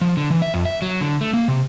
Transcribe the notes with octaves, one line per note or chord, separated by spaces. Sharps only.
F3
D3
E3
E5
F2
E5
F#3
D3
A3
A#3
C3